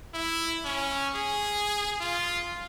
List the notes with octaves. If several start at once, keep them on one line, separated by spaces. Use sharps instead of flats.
E4
C#4
G#4
F4